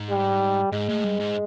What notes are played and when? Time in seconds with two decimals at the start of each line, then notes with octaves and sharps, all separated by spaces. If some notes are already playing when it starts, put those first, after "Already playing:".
Already playing: G#2
0.11 G3
0.72 G#2 G#3
0.89 A2
1.04 G2
1.19 G#2